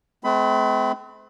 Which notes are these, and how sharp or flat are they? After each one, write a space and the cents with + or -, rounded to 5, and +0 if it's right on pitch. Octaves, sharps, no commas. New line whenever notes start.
A3 -45 C4 -30 B5 +20